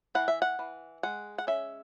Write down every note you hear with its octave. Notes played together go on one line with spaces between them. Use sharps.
E3 F#5
E5
F#5
E3
G#3 F#5
F#5
C#4 E5